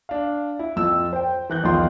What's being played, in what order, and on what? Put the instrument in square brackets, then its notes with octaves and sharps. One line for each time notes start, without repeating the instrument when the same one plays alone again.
[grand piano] D4 F5
E4
F2 F3 E6
C5 G5
E3 F#6 G6
B1 E2 D#3 F3 F4 C6